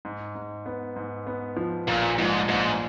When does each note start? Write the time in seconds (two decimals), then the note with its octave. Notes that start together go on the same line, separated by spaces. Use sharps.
0.05 G#2
0.35 G#2
0.66 B3
0.96 G#2
1.27 B3
1.57 F3
1.87 A#1 A#2
2.18 G#2 F3
2.48 A#1 G#2